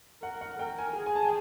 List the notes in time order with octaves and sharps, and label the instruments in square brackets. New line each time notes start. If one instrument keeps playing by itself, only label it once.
[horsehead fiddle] A#4 [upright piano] F#5
[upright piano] F#5
[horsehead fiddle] A#4 [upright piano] G5
[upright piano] G#5
[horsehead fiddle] G#4
[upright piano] G#5
A5
G5